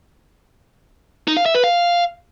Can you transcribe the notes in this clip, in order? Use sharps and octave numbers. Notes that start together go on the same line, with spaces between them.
D#4
F5
E5
B4
F5